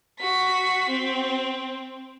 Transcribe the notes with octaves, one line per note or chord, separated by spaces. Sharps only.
F#4 B6
C4